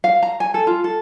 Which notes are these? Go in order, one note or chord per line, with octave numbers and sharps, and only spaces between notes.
F5
A#5
G#5
A4
F4
A4